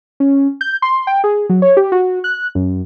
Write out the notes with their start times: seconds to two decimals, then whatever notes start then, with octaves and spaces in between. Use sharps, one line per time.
0.20 C#4
0.61 G6
0.82 C6
1.07 G5
1.24 G#4
1.49 F#3
1.62 C#5
1.77 G4
1.92 F#4
2.24 F#6
2.55 F#2